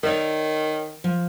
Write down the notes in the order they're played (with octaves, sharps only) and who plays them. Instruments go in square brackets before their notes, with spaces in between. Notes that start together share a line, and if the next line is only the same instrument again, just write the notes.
[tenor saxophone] D#3 [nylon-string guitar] C#5 D5 E5
[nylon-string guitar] F3